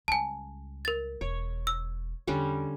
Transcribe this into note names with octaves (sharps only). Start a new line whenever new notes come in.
C#2 G3 G#5 A5
A#4 A6
E1 C#5
E6
E2 D3 G3 C#4